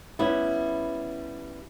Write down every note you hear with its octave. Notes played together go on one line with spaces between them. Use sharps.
G3 B3 C#4 E4